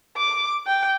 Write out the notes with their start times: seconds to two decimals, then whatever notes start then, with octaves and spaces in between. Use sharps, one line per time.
0.17 D6
0.67 G5